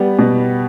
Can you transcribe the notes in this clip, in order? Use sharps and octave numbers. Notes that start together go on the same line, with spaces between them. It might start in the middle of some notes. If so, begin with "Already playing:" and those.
Already playing: G3 B3
B2